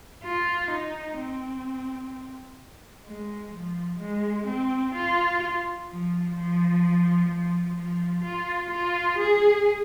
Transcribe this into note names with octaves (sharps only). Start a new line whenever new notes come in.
F4
D#4
C4
G#3
F3
G#3
C4
F4
F3
F3
F3
F3
F4
F4
G#4